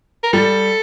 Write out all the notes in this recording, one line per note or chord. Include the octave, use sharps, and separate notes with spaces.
A#4
G3 A4